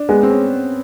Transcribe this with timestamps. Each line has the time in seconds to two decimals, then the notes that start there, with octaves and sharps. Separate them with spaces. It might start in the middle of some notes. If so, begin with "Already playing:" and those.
Already playing: D4
0.09 G#3 B3
0.23 C4
0.30 C#4